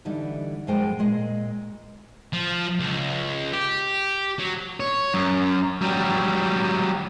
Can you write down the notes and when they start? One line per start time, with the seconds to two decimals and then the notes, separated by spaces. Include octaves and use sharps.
0.05 D3 E3 G3 D#4
0.67 F#2 B2 F3 G#3 C5 G5
0.99 A#2 G#3 D#5
2.33 F3
2.79 C#2
3.53 G4
4.39 F#3
4.80 C#5
5.14 F#2
5.81 F#3 G3